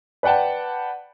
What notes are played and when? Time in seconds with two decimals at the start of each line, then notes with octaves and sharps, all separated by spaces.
0.23 B4 D5 F#5 G5 A5